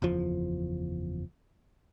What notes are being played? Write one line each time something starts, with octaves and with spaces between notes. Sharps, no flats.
F#1 E2 F3